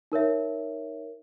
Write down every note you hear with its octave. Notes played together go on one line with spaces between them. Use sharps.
D#4 A#4 C#5 E5